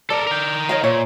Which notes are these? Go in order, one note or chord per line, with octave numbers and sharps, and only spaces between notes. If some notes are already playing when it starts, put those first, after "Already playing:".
A4 A#4 D5
A#4 G5
C#5 D#5 F5
A#2 C5 C#5 E5